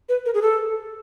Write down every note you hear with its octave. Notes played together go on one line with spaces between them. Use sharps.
B4
A#4
G#4
A4